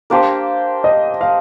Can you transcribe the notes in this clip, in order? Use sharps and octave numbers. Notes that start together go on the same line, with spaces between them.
A#3 D4 G4 C5
D#5
F5